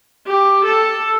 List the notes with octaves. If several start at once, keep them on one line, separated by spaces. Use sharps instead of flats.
G4
A4